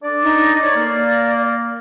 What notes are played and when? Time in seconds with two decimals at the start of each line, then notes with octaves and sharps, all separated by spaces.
0.03 D4 A4 D5
0.23 D#4
0.62 C#5 D5
0.76 A#3